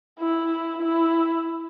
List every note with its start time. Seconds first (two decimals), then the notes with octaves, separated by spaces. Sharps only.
0.20 E4
0.82 E4